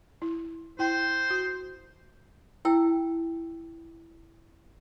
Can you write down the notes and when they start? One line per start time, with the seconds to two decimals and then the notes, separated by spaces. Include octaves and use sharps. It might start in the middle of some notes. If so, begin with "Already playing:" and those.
0.22 E4
0.79 E4 C5 G5
1.30 F#4
2.65 E4 G5 A5 E6